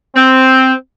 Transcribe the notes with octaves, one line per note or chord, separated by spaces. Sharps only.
C4